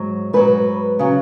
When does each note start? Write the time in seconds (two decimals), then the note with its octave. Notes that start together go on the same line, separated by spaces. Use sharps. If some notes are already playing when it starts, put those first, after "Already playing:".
Already playing: G#2 F#3
0.33 G#2 F#3 B4
0.99 C#3 F#3